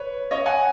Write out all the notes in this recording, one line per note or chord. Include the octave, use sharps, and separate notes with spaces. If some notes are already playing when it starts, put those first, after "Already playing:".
Already playing: B4 C#5
C#5 D#5
F#5 G#5